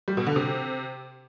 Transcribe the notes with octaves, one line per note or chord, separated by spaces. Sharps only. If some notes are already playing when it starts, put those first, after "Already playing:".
G3
B2
D3
C3